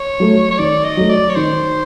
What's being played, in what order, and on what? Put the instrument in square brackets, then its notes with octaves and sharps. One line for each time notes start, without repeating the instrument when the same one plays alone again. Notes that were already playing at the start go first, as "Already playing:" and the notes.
Already playing: [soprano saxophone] C#5
[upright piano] F#3 A3
[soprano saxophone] C#5
[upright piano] D#3 [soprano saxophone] D5
[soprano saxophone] D#5
[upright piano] F#3 A3
[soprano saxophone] D5
C#5
[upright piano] D#3 [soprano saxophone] C5